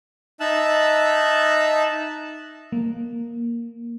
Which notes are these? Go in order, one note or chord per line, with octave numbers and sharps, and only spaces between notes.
D#4 E5 A5 E6 F#6
A#3